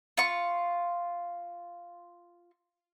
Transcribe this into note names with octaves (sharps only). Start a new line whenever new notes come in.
F4 C#6